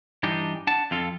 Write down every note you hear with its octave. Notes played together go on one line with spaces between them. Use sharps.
G2 E3 D4 D#4 G4
D4 F#5 A5
F2 F4 A4